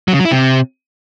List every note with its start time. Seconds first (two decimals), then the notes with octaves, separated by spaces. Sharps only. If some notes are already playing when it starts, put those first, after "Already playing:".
0.08 F#3
0.14 C#3
0.19 F#3
0.25 E4
0.31 C3